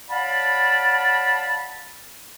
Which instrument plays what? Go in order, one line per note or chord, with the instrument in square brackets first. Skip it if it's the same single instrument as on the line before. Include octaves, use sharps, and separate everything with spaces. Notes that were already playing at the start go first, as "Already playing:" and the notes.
[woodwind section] C#5 D5 F5 F#5 A5 B5